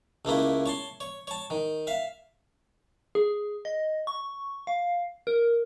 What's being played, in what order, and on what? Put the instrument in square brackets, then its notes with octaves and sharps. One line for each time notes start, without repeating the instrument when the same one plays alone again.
[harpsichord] C#2 A3 A#3 E4
C#5 A5 C6
C#5
C#5 A5
D#3
E5 F5
[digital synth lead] G#4
D#5
C#6
F5
A#4